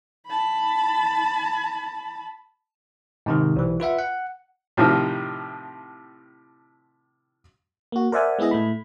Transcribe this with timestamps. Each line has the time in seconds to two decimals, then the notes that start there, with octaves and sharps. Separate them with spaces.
0.28 A5 B5
3.26 G#2 C3 D#3
3.56 B1 E3
3.80 F4 B4 E5 F#5
3.99 F#5
4.77 A2 C3 D#3 F3
7.92 A#3 F#4
8.12 A#4 C5 D5 E5 F#5 G#5
8.39 G#3 B3 E4 G#4 D#5
8.51 A2 A3 B5